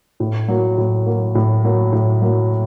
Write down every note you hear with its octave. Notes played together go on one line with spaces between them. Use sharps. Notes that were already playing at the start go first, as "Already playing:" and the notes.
A2
F#3 A#3
A2
F#3 A#3
A2
F#3 A#3
A2
F#3 A#3